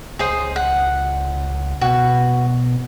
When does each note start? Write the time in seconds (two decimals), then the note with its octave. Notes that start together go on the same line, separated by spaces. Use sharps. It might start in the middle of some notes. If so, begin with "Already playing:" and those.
0.19 C#2 G#4 C5 D#6
0.56 F#5
1.81 B2 F#4